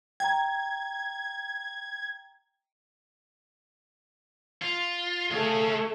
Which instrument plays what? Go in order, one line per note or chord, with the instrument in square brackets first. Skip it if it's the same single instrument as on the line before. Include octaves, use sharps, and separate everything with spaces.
[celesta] G5 A#5 [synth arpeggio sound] G#6
[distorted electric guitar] F4
[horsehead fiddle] A3 A4 [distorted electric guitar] G#4 F5